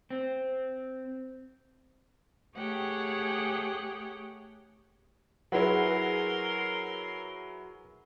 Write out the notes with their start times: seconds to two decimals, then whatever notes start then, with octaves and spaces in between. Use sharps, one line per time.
0.10 C4
2.57 A3 G4 G#4 C#5 F#5 G5
5.52 F#3 E4 G#4 A#4 B4 F#5 C6